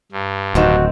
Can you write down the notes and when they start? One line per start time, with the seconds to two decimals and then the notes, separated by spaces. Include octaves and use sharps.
0.12 G2
0.55 D1 D#3 C4 F#4